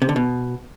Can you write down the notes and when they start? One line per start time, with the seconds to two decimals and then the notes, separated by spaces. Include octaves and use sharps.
0.02 C3
0.09 D3
0.16 B2